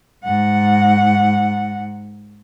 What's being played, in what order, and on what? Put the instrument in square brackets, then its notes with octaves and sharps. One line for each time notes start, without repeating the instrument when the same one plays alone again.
[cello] G#2 F#5